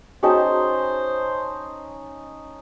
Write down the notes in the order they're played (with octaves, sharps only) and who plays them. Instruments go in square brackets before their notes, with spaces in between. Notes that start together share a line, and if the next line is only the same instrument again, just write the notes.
[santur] C#4 D#4 A5 [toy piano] F#4 G#4 G5 [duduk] C5